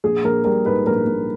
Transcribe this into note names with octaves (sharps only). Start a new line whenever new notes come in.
A#1 G#4
A#1 A#4
G3 A#4
G#2 B4
A#1 A#4
A#1